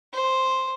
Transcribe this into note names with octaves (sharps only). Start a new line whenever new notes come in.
C5